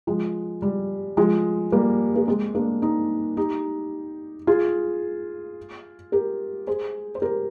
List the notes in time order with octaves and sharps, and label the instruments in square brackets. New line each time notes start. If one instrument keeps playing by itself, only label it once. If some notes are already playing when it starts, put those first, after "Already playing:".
[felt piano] F3 G#3
G3
F3 G#3
G3 A#3
A#3
G#3 C4
A#3 D4
C4 D#4
D#4 G4
F4 G#4
G4 A#4
G#4 C5
C5
G4 A#4